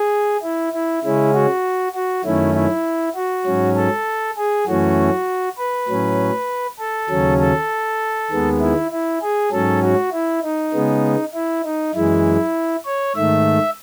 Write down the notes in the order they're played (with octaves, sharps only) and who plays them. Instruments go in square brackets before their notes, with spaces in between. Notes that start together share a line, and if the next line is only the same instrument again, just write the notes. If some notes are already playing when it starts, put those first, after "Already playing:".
Already playing: [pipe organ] G#4
E4
E4
C#3 G#3 C#4 E4
F#4
F#4
F#2 D#3 A3 C#4 E4
E4
F#4
G#2 F#3 C#4
A4
G#4
F#2 E3 A3 C#4 F#4
B4
A2 F#3 C#4
A4
D#2 C#3 F#3 C#4
A4
D#2 D#3 G#3 B3
E4
E4
G#4
G#2 F#3 C#4 A4
F#4
E4
D#4
C#3 G#3 B3
E4
D#4
F#2 E3 G#3 E4
C#5
G#2 D#3 A3 E5